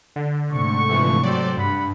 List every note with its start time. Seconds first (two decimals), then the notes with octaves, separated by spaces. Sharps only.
0.16 D3
0.50 G#2 C3 A3 C#6
0.89 D3 E3 F3
1.23 F#3 G4 A4 C5 D5
1.57 G2 F#5 B5